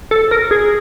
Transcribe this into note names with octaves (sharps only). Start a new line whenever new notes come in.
A4
A#4
G#4